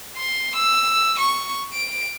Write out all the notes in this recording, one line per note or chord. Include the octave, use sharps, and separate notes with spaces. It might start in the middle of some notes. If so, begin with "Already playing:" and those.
C6
E6
C#6
D7